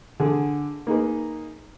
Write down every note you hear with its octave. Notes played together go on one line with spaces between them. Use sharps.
D3 G#4
A#3 D#4 G#4 B4